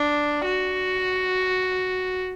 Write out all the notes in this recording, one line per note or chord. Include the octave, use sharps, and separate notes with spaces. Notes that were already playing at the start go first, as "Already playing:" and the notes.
Already playing: D4
F#4